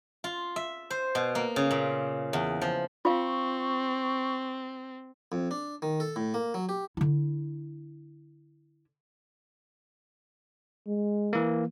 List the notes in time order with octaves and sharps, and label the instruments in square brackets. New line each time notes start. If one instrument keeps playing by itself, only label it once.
[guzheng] F4
E5
C5
B2
A#3
C#3
A#2
E2
F3
[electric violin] C4 [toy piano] F4 F5 [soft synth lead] C#6
[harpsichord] F2
D4
D#3
A4
A2
A#3
F#3
G4
[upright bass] D3 E4
[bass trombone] G#3
[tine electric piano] E3 A#3